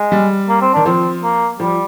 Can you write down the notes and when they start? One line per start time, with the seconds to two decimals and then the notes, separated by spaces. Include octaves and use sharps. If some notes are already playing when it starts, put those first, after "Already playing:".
Already playing: G#3
0.12 G3
0.49 A#3
0.61 C4
0.74 D#3 D4
0.86 F3 C4
1.23 A#3
1.60 F3 G3